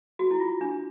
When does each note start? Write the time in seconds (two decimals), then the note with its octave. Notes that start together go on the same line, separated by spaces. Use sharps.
0.19 F#4
0.31 E4
0.40 F4
0.61 D4